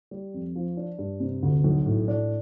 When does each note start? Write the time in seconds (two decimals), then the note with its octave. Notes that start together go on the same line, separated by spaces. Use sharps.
0.11 G3
0.34 F2
0.56 F3
0.77 D4
0.99 G2
1.20 C3
1.43 D2
1.64 B1
1.86 A2
2.08 D4